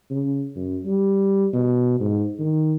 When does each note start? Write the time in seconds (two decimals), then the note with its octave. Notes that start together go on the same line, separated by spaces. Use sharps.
0.10 C#3
0.56 F#2
0.85 G3
1.53 B2
2.00 G#2
2.39 D#3